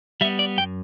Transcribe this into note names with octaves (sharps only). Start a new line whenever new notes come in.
G3 B3 E5
D5
F#2 G5